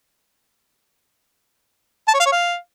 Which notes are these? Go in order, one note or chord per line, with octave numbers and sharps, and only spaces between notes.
A5
C#5
F5
C#5
F5